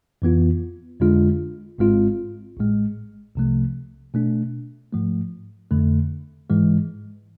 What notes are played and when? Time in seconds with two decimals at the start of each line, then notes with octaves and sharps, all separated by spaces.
0.22 F2 E3 B3 F4
1.00 F2 D3 G#3 D4 F4
1.78 G#1 G#2 G#3 C4 F4
2.57 A1 A2 G#3
3.35 C2 C3 F3 A3
4.14 B2 A3 D4
4.93 G#2 F3 A3
5.71 F2 D3 A3
6.50 G#2 E3 G#3